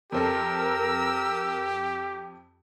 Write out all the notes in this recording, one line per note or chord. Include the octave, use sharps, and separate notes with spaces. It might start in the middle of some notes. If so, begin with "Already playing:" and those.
F2 C4 G4 A4 A#4 E6